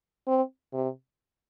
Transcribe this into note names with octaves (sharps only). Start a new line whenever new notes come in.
C4
C3